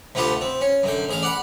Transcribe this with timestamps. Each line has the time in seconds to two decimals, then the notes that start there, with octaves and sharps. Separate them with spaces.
0.15 D2 A3 B3 F4 G4 A5
0.41 C4
0.61 C#4
0.83 F#2 D3 G5
1.09 A1 G#4 F5
1.22 D5 F#5 B5